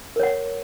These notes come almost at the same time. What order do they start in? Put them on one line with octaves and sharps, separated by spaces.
A#4 C#5 F#5